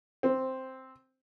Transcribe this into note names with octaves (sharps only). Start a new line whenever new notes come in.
C4